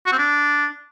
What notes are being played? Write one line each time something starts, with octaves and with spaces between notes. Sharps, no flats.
F#4
C4
D4